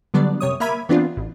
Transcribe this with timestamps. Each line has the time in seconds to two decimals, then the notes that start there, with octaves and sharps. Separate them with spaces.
0.14 D3 F#3 G3 B3 D4 D5
0.40 F#2 C3 C#5 D#6
0.60 A#3 A#4 E5 B5 G#6 D#7
0.89 E3 B3 C4 D4 F4
1.17 A1